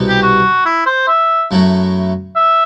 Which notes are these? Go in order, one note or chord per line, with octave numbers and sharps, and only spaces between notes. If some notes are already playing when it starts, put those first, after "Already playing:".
Already playing: C2 B2 G3 B3
G4
F#4
E4
C5
E5
F#2 F#3 A3 E4
E5